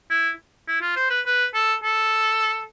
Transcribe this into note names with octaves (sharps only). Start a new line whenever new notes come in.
E4
E4
F4
C5
B4
B4
A4
A4